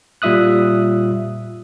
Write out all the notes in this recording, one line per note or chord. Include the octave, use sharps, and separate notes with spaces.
A#2 G3 F4 E5 D#6 F#6